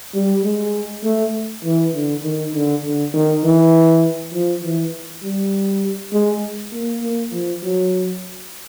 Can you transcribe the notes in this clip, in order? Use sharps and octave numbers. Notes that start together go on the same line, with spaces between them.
G3
G#3
A3
E3
D3
D#3
D3
D3
D#3
E3
F3
E3
G3
G#3
A#3
A#3
F3
F#3